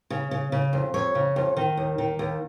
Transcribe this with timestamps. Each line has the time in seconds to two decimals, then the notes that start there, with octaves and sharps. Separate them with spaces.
0.10 C#3
0.31 C#3
0.52 C#3
0.73 F2
0.94 F2 C#5
1.15 C#3
1.36 F2
1.57 D#3
1.77 D#2
1.98 D#3
2.19 D#2